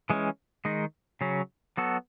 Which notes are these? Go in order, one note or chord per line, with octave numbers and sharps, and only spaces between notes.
E3 G#3 C#4
D#3 G#3 D#4
C#3 F#3 C#4
F#3 B3 F#4 A4